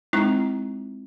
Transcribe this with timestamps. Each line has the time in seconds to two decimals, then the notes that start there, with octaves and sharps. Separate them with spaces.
0.13 G#3 C4 D#4 E4 C#6